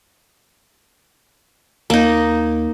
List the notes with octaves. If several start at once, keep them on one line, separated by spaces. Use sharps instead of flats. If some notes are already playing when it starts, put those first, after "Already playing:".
D#2 A#3 D#4